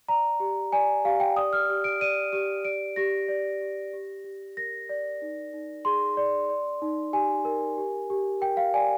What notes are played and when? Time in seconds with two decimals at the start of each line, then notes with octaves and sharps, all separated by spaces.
0.08 D5 A#5
0.40 G4
0.72 D5 G#5
1.05 G4 F5
1.20 G5
1.36 D5 D#6
1.53 F6
1.69 G4
1.84 D7
2.01 D5 D#7
2.33 G4 D#7
2.65 D5 D7
2.96 G4 A#6
3.28 D5
3.62 G4
3.93 G4
4.24 G4
4.57 A#4 A#6
4.89 D5
5.22 D#4
5.53 D#4
5.85 G#4 C6
6.17 D5
6.49 D5
6.82 D#4
7.13 G4 G#5
7.45 A#4
7.78 G4
8.10 G4
8.41 A#4 G5
8.57 F5
8.74 D5 G#5